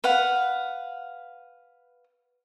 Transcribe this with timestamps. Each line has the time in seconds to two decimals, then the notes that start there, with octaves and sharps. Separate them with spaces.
0.04 B4 F5 F#5